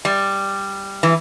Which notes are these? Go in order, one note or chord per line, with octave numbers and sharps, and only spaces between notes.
G3
E3